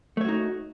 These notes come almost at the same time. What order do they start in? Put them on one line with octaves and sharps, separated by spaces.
A3 C#5 F#4 D#4